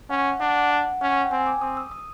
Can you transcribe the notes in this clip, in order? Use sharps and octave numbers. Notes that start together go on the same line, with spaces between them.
C#4 F#5
D4 F#5
F#5
F#5
C#4 F#5
G5
C4 G#5
D6
C4 D#6
E6
D#6